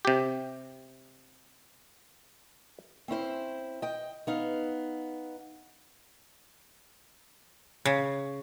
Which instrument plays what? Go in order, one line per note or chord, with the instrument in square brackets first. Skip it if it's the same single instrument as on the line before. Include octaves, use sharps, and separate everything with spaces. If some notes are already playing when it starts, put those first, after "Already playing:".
[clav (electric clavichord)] C3 G4
[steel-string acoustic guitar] C4 C#4 E4 C5
D#5 G5
B3 D#4 F5
[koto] C#3